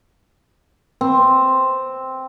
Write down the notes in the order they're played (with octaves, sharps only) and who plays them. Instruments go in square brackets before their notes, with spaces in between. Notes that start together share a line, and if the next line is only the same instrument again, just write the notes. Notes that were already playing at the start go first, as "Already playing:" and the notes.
[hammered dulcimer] C4